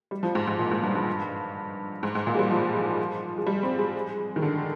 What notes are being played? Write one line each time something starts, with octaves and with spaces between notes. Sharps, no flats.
G3
F3
G#2
G#2
A#2
G#2
G2
G2
G#2
G#2
A#2
G#3
G3
F3
G#3
G3
C4
G#3
D#3
D3